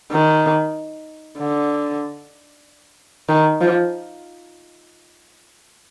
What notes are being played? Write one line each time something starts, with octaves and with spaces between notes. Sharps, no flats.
D#3
D3
D#3
F3